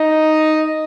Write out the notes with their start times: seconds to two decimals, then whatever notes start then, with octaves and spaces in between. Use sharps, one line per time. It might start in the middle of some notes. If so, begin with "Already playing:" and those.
Already playing: D#4